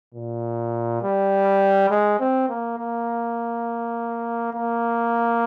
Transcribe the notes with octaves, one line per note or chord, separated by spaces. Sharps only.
A#2
G3
G#3
C4
A#3
A#3
A#3